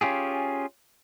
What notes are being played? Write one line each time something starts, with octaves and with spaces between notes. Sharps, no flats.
C#4 F4 G4 G#4